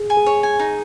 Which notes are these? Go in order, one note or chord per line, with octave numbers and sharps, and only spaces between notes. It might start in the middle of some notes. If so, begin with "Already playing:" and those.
Already playing: G#4
G#5
G#4
C#5
G#5
D#4